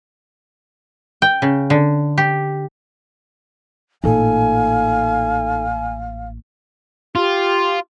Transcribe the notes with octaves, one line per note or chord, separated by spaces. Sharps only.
G5
C#3
D3
G4
A1 A#2 D#4 A4 F5 G#5
F4 G4